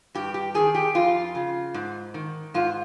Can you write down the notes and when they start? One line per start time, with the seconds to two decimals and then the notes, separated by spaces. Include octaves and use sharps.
0.15 G2 G4
0.34 G4
0.54 D#3 G#4
0.75 G4
0.95 F2 F4
1.35 C#3
1.74 G#2
2.14 D#3
2.54 G#2 F4